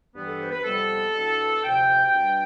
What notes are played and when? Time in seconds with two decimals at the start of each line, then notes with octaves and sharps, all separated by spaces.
0.15 G2 E3 B3
0.27 A4
0.40 C5
0.51 B4
0.64 F2 C3 G3 B3 A4
1.14 E2 B2 B3 D4
1.63 D2 C3 F3 G5
2.14 B2 G3 D4